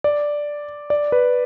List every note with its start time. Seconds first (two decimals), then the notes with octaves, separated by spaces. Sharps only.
0.04 D5
0.90 D5
1.12 B4